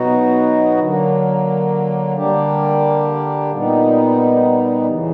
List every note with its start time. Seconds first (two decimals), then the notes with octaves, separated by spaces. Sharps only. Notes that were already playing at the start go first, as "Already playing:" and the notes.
Already playing: B2 F#3 B3 D#4 F#4
0.79 D3 F#3 A#3
2.15 D3 G3 A#3 D4 G4
3.51 A#2 G3 B3 D#4
4.87 E2 C#3 E3